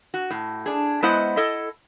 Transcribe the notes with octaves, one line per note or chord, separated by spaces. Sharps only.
F#4
A2
D4 G#4
G#3 B3 E4 C5 D#5 F#5
E4 A4 D#5